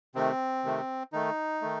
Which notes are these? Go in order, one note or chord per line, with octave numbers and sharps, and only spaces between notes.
C3 D#3 A3 C4
C3 D#3 A3
D#3 A3 D#4
D#3 A3